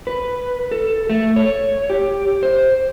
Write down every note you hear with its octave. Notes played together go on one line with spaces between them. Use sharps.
B4
A4
A3
C#5
G4
C5